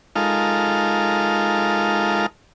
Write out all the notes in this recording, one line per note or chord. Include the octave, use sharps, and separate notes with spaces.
G#3 D#4 F4 A4 A#4 F5